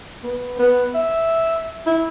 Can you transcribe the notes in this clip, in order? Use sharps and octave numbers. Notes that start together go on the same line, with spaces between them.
B3
B3
E5
E4